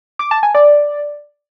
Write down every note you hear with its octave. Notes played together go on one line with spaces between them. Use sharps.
D6
A5
G#5
D5